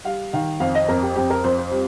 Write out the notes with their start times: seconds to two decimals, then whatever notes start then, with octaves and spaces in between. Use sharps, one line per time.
0.05 G3 F5
0.33 D#3 F5
0.60 F2 F5
0.75 D#5
0.88 F2 A#4
1.02 G4
1.16 F2 G4
1.30 A#4
1.44 F2 C5
1.58 C5
1.72 G3